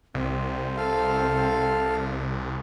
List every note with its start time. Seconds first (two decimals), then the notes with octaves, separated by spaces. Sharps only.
0.14 C2 C4
0.77 A4 F5